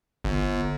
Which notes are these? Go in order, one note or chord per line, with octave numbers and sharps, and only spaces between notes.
G1